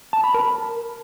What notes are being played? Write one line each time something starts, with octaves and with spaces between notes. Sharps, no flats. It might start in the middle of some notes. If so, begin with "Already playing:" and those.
A5
B5
A#4